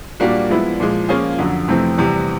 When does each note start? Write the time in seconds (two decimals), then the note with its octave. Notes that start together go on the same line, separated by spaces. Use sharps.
0.20 A#2 G3 A#3 D4 F#4
0.49 F3 G#3 B3 E4
0.80 A#2 F3 G#3
1.09 F3 A#3 C#4 F4 G#4
1.38 F2 D3 F#3
1.68 F2 C3 E3 A3 C4
1.98 E2 C3 E3 G3